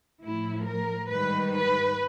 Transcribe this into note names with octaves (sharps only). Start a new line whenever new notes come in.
A2 F3 A3 E4
A#4
G#2 D#3 G3 B4
B4